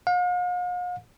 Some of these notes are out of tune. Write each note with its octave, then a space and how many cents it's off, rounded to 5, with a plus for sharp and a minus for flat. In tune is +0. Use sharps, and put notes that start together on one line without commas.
F5 +45